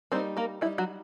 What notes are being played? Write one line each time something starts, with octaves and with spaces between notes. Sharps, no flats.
G3 A#3 C4 D#4 C5
A#3 A#4
G3 A#3 D#4 E4
F#3 F#4